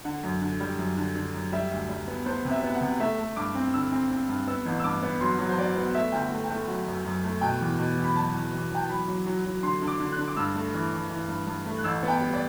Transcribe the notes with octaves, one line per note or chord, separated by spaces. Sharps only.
D3 F#5
F#2
D3
G3
F#2
D3
D3
F#2
G3 E5
D2
G3
B3
B3 C5
C3
E5
B3
F#5
C3
A3 E5
A3
G2 D6
C4
D3 E6
C4
C4
G2
B3 E6
A1
E6
G2 D6
B3
F#3 C6
F#3
C5
F#3 D5
B3
A3 E5
G1 G5
F#5
A3
G5
A3
F#3 F#5
F#2
F#2
A3
B2 G5
E2
B2
E2
B5
F#3 A5
E2
E2
E2 G5
A5
F#3 B5
F#3
F#3
F#3
D3 C6
D3
D6
D3
F#6
D3
D6
G2 E6
A3
E3
E3
E3
G2
G2
A3
F#6
A1 E6
B3
G5
G3
D5